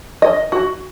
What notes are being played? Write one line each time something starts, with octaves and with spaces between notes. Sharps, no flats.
D#5
F#4